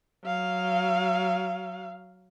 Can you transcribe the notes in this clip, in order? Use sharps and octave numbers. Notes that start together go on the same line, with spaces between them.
F#3 F5